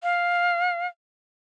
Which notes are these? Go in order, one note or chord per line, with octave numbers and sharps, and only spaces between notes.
F5